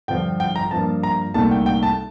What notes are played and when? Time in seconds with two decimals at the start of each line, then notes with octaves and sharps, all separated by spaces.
0.08 G2 D3 F3 G5
0.40 G5
0.56 A#5
0.71 G2 F3 A#3 A5
1.03 A#5
1.34 C2 A#2 A3 D#4 A5
1.51 G5
1.66 G5
1.83 A5